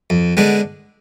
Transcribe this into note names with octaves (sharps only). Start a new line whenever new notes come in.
F2
D3 G#3 B3 D4